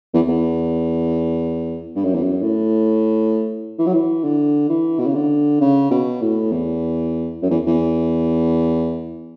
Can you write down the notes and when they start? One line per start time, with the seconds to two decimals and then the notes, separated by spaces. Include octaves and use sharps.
0.14 E2
0.28 E2
1.96 G2
2.04 F#2
2.14 E2
2.23 F#2
2.42 A2
3.79 E3
3.86 F#3
3.94 E3
4.24 D3
4.69 E3
4.99 B2
5.07 C#3
5.15 D3
5.61 C#3
5.91 B2
6.21 A2
6.52 E2
7.42 F#2
7.50 E2
7.67 E2